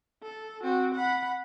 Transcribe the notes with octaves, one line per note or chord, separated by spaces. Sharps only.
A4
C4 F#4
F#5 B5